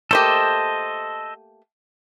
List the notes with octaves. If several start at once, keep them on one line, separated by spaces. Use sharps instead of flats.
A3 A#3 G4 A4 C5 D#5